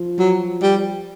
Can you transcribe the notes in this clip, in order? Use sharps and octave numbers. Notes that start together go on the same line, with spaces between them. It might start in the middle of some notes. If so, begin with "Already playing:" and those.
Already playing: F3
F#3
G3